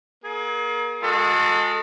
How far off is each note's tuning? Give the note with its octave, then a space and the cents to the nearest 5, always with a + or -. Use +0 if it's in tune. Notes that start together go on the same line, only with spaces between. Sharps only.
A#3 +30 G#4 +40
G#3 +0 F#4 -40 A4 +15